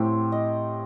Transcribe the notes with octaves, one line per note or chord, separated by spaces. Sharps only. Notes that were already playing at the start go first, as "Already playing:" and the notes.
Already playing: A2 C4 G4
D#5